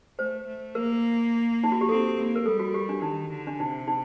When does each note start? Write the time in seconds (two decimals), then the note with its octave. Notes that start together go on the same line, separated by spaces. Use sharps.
0.18 A3 C5
0.47 A3
0.75 A#3 A#4
1.64 D#4
1.72 F#4
1.81 G4
1.89 C4 A4
2.17 A#3
2.36 A#4
2.46 G3 A4
2.59 F#4
2.74 G4
2.89 D4
3.02 D#3 D#4
3.31 D3
3.47 D4
3.59 C3 D#4
3.87 D#4